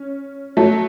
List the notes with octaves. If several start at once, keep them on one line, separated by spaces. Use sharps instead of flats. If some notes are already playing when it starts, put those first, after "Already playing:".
Already playing: C#4
F#3 A3